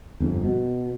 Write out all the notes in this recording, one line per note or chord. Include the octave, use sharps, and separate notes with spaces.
G1 F2
B2